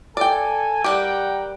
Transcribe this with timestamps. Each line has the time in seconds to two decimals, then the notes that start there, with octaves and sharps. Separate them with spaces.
0.17 A4 D5 G5 G#5
0.84 G3 G4 A#4 F#5 G5